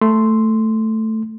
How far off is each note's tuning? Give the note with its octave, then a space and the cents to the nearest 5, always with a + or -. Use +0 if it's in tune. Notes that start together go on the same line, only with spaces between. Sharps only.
A3 +0 C6 +0